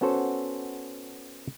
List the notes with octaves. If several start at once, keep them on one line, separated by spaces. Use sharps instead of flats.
B3 C#4 F#4 A4 C5